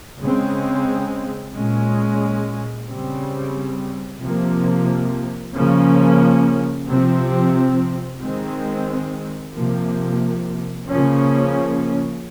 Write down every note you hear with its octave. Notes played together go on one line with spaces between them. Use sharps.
C#3 G#3 C4
A#2 G#3 C#4
C#3 G3 C4
C3 F3 A#3
C#3 F3 A#3 C#4
C3 F3 C4
D#3 G#3 C4
C3 F3 A#3
C#3 F3 A#3 C#4